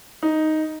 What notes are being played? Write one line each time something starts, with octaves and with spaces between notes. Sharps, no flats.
D#4